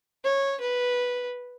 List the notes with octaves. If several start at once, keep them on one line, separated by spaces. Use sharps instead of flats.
C#5
B4